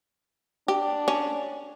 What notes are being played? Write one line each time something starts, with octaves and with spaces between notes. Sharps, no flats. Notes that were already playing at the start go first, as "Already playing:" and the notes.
D4 G4
C#4